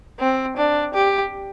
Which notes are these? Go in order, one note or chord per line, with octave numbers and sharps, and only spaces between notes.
C4
D4
G4